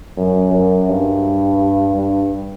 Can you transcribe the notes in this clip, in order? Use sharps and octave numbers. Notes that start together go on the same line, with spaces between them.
F#2
F#2
G2
G2